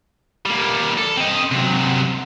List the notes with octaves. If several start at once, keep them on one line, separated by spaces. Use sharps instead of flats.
G3 A#3
A4
C4 D#5
C3 F#3